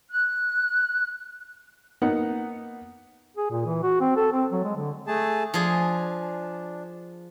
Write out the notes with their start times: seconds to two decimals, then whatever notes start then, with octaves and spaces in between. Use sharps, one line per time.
0.10 F#6
2.02 A#3 B3 D#4 F#5
3.37 G#4
3.51 A#2
3.66 E3
3.83 F#4
4.01 C4
4.17 A4
4.33 C4
4.52 F#3
4.64 G#3
4.76 D3
5.07 A3 G#4 A5
5.54 F3 D4 G#4